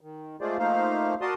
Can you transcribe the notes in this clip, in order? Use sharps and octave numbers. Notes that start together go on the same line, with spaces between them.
D#3
G#3 A3 F4 G#4 C5 D5
F3 A3 A#3 D#4 C5 F5
F#4 A#4 D5 A5 C6 D#6